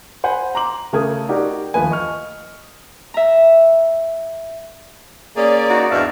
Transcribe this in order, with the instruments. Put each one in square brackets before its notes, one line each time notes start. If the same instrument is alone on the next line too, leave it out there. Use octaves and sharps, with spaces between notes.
[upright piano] C5 F#5 G#5 B5
A#5 C6 D6 F#7
C#3 A3 A4 A#4 D#6 G#6
D#4 F#4 G4 A#4 D5
D#2 F3 A3 B4 G#5
D#5 C#6 F6
[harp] E5 A#5
[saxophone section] A#3 C#4 G#4 [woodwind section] D5
[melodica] D#4 [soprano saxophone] F#4
[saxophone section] E2 G#2 D4 [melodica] E5 F5